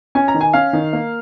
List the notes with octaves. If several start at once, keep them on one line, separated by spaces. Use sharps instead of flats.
C#4 G#5
A#5
D#3
G#5
C#4 F5
D#3
A#3